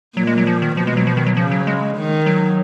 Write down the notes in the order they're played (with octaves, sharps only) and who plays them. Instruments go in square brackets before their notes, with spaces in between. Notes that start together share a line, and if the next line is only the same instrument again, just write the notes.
[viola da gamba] A#2 [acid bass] F#3
[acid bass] G#3
F#3
F3
D#3
[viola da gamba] B2 [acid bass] F3
[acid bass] G#3
F#3
F3
D#3
F#3
[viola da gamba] C#3 [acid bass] F3
[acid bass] F#3
G#3
[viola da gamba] D#3
[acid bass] F#3